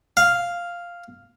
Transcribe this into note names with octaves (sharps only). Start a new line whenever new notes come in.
F5